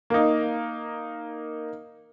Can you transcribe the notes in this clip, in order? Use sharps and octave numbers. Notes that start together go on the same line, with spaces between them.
A#3 D#4